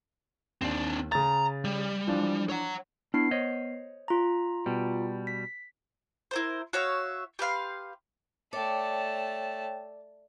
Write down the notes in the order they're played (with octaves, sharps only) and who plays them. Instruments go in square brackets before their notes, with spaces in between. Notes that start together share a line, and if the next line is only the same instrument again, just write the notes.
[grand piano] D#2 [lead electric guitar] C4 D4
[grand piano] C#3 A6 [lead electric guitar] A#5
[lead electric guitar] G3
[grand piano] E3 F3 D4
[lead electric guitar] C#5 F#5
[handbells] B3 C7 [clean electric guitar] D4 E4
[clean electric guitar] C5 C#5 D#5
[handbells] F4 A#5
[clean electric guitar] B2 G3
[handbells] B6
[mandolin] E4 A#4 C5
F#4 C#5 E5 F5
G4 B4 F5 C6
[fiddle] A3 A5 [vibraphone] C#5 G5 [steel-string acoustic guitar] D5